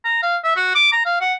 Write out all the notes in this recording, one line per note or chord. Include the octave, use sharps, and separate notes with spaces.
A#5
F5
E5
F#4
D6
A#5
F5
F#5